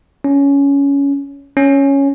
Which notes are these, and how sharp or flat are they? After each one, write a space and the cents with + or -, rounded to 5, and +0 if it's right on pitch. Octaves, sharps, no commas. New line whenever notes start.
C#4 +15
C#4 +0